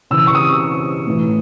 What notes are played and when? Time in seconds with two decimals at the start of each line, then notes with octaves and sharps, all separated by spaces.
0.11 C#3 E3 E6
0.27 C#6
0.35 D#6
1.07 A2 E3